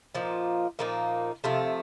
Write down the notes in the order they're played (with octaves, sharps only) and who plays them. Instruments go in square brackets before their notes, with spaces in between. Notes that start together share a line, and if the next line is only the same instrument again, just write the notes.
[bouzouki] A#2 F3 A#3 D#4
A#2 F3 A#3 D#4
C3 F3 A3